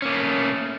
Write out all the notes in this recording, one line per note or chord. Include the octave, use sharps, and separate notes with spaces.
A3 A#3 C#4